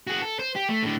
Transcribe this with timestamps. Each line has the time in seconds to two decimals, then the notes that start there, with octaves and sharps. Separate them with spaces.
0.07 F#4 G#4
0.22 A4
0.39 C5
0.55 G4
0.68 A3
0.83 A2 D3